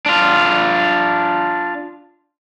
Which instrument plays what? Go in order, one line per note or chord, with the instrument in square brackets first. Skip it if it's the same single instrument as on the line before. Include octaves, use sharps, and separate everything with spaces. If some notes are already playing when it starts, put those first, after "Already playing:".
[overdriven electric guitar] D4 F4